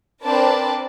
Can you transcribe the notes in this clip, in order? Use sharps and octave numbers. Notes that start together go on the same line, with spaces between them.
C4 D4 A#4 B4 D5 A5